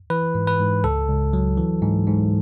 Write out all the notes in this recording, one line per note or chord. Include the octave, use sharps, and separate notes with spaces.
E3 B4
G#2
B4
G#2
C#2 A4
C#2
F#3
E3
G#2
G#2